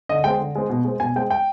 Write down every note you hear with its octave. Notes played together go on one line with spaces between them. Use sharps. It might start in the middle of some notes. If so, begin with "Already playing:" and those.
D3 D#5
G#3 C4 G5
D3
G#3 C4
B2
G#3 C4
B2 G#5
G#3 C4 G5
G5